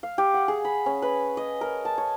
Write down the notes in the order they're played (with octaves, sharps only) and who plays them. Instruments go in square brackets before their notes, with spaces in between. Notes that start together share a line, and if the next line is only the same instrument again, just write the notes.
[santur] F5
G4
F#5
G#4
B5
C#4
B4
D#5
A#4
A5
C#5